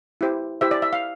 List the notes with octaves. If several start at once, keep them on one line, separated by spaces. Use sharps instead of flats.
E4 G4 C5
E4 G4 C5 E5
D5
E5
F5